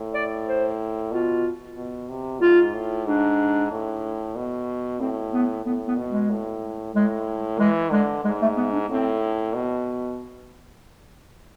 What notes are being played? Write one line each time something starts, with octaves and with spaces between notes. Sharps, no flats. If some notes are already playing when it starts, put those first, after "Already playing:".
Already playing: A2
D5
C5
B2 F4
B2
C3
G#2 F4
A2
G#2 D4
A2
B2
A2 C4
B3
A2 B3
B3
B2
G#3
A2
A2 G#3
E3 G#3
D3 G#3
G#2 G#3
A3
B3
D4
A2 C4
B2